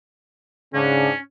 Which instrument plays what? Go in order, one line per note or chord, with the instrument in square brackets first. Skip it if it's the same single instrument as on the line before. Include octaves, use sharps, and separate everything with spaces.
[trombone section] G#2 D4 [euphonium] C#3 [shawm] C#4